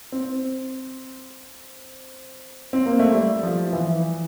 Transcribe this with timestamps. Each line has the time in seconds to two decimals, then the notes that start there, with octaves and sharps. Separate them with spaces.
0.12 C4
2.73 C4
2.86 A#3
2.99 A3
3.13 G3
3.43 F3
3.73 E3